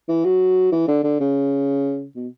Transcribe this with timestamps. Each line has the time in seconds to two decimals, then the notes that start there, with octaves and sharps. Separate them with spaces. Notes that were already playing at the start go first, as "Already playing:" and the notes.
0.08 E3
0.25 F#3
0.72 E3
0.88 D3
1.04 D3
1.20 C#3
2.16 B2